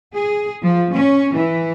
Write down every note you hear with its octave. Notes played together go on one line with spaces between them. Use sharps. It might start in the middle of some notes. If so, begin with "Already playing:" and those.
G#4
F3
C#4
E3